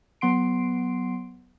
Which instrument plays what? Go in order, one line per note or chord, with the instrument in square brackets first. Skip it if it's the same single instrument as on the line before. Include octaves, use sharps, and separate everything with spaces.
[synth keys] F#3 B3 F#5 C6 C7 D7